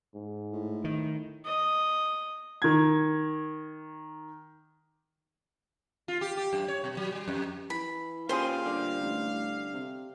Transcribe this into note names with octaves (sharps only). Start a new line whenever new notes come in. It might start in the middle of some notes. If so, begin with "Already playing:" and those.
G#2
A2
D#3
D#5
D#3 G#6
F4
G4
G4
F#2
C#5
B2
F#3
G3
F2
E3 B5
A#2 C#4 G4 G#4 C5 F5 C6
D3 G3
A1
C3